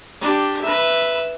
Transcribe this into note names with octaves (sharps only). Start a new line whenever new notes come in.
D4 G4
B4 E5